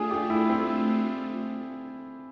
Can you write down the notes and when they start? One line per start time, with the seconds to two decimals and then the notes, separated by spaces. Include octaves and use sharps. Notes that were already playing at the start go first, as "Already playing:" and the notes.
Already playing: A3 D4 F4 G#4
0.11 G4
0.30 E4
0.49 C4